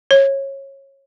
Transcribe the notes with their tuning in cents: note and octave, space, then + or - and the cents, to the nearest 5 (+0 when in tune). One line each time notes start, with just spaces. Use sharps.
C#5 -20